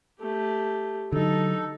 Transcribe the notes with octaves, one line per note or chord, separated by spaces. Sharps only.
A3 G4
D3 F#3 D#4 A4